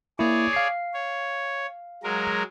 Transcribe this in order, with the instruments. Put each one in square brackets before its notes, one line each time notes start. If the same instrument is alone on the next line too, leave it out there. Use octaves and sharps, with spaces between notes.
[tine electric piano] A#3 E4 [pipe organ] G#4 C#5 D5
[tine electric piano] F5 C7
[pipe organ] C#5
F#3 G#3 A#4